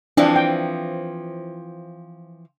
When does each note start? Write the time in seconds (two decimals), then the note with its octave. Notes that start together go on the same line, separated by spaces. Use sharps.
0.17 E3 F3 C4 D4
0.36 G5